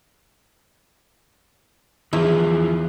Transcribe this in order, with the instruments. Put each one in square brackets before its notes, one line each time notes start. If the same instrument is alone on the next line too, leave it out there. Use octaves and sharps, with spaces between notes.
[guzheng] E2 E4 [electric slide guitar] E3 F3